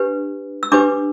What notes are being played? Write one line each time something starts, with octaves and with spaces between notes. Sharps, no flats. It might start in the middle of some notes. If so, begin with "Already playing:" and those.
Already playing: D4 G4 B4
E6
D4 G4 B4 D6